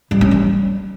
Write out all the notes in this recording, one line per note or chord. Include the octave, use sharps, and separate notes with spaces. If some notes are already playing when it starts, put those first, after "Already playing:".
G3
C#4
G3